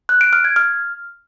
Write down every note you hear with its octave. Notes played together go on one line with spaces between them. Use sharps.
F#6
D7
F6
G#6
F6